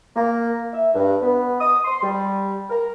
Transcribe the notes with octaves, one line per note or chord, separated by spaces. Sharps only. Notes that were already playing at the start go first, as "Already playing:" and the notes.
A#3
E5
G2
B3
D#6
C6
G3
A#4